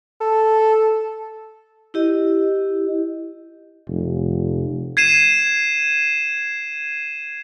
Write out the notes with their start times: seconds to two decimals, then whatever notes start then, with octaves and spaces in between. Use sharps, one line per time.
0.21 A4
1.94 E4 G4 D#5
3.88 F1
4.97 G#6 C7 D#7 E7